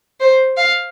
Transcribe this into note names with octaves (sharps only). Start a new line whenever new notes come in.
C5
F5